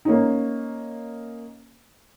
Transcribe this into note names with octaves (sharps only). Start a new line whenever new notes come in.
A#3 C#4 D#4